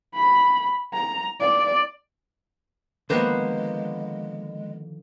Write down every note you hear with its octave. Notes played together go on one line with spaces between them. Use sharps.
B5
A#5
D5
D3 D#3 F3 G#3 A#3 B3 C5